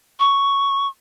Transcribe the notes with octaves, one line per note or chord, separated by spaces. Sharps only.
C#6